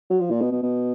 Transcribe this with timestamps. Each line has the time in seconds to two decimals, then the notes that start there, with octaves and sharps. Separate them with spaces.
0.10 F#3
0.21 F3
0.30 A#2
0.41 B2
0.52 B2
0.63 B2